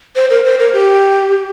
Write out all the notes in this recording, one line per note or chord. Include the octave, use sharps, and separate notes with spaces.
C5
A#4
C5
A#4
G4